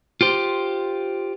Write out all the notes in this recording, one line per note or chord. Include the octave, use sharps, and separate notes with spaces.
F4 G4 C5